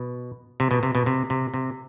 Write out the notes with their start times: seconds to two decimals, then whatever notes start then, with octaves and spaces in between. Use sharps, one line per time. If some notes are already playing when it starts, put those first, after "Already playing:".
Already playing: B2
0.60 C3
0.71 B2
0.83 C3
0.95 B2
1.06 C3
1.30 C3
1.54 C3